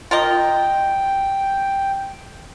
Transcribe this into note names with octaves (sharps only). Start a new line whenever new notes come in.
F4 A#4 D#5 G5